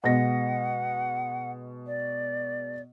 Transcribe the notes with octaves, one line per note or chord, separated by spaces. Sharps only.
B2 G#3 F#5 A#6
D5